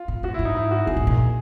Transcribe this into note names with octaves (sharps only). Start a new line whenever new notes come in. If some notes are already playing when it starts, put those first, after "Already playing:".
Already playing: F4
A2
A2 F#4
E4
G#2
D#4
E4
F#4
G#2 G#4
A2
A#2